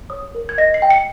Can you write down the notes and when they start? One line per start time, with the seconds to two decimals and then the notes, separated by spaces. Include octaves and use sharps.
0.10 C#5 D#6
0.35 A#4
0.49 G#6
0.58 D#5 A#6
0.74 C7
0.82 G5
0.90 C#7